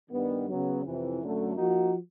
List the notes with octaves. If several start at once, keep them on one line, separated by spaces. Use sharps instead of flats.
G2 D#3 G3 B3
C#3 F#3 B3
F2 C3 E3
F#2 D3 F#3 A3
F3 A#3 D#4 F#4